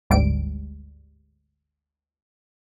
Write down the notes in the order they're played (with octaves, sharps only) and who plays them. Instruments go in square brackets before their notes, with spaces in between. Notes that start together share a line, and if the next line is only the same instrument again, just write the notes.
[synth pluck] G1 D2 G#2 G3 D7